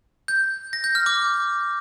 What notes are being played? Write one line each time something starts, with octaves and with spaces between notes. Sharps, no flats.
G6
A#6
G6
F6
D6